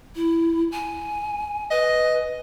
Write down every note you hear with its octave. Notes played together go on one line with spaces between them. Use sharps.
E4
G#5
B4 D#5